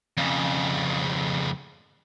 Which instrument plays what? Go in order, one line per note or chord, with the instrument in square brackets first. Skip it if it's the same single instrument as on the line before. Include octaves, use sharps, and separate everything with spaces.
[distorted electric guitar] F2 C#3